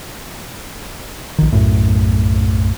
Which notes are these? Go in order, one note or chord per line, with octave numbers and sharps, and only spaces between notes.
A#1 D#3
B1 F#2 A2